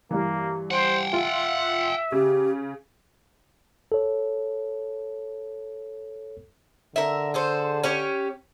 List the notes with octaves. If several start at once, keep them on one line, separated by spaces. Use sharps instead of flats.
G2 E3 A#3
C5 F#5 G5
F4 E5
C#3 G4
A4 C#5
D3 A#4 E5
G#4 A4 C5
C#4 G4 C#5